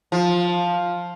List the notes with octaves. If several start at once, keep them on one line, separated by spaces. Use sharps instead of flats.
F3